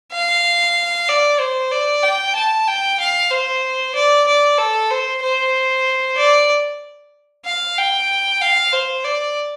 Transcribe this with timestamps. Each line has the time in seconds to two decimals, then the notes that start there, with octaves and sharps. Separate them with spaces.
0.12 F5
1.09 D5
1.40 C5
1.71 D5
2.03 G5
2.35 A5
2.68 G5
3.00 F5
3.31 C5
3.95 D5
4.27 D5
4.58 A4
4.90 C5
5.22 C5
6.17 D5
7.45 F5
7.78 G5
8.41 F5
8.73 C5
9.05 D5